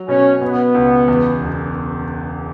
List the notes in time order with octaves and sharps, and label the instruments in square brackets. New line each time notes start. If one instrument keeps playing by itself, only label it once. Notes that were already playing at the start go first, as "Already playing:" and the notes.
Already playing: [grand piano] F#3
[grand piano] B2 [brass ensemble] C#4
[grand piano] B2 [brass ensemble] B3
[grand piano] C#2
E2
E1